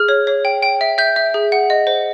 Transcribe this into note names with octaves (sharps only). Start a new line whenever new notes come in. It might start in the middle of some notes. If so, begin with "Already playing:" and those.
Already playing: G#4 F6
C#5
C#5
G5
G5
E5
E5 G6
E5
G#4
F#5
D#5
C5